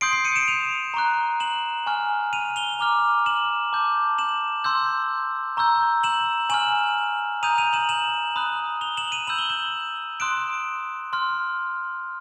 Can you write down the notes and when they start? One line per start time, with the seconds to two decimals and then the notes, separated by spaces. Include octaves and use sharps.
0.01 C6 D#6 G6 C7 D7
0.13 C7 D7
0.25 C#7 D#7
0.36 D7 E7
0.48 D#7 F7
0.94 A#5 C#6 F#6
1.40 E7 F#7
1.86 G#5 C#6 F6
2.33 D#7 F7
2.56 F7 G7
2.79 A#5 D6 F6
3.26 E7 F#7
3.73 A5 D6 G6
4.18 E7 F#7
4.64 C6 E6 G6
5.57 A#5 C#6 E6 G6
6.03 E7 F#7
6.50 G#5 C#6 F6 E7 F#7
7.43 A#5 D#6 G6 D#7 F7
7.58 D#7 F7
7.73 E7 F#7
7.89 E7 F#7
8.36 B5 D#6 F#6
8.81 F7 G7
8.97 E7 F#7
9.12 D#7 F7
9.27 B5 E6 G6 F#7
9.38 G7
9.50 E7 F#7
10.20 C6 D#6 F#6 D7 E7
11.13 C6 F6